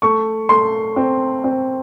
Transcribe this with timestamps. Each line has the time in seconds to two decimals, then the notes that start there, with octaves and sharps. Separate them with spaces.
0.02 A3 C#6
0.49 A3 C6
0.96 C4
1.44 C4